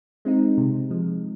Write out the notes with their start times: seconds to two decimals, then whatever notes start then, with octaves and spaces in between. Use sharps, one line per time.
0.25 G#3 C4 D#4
0.58 C3
0.90 F3 G#3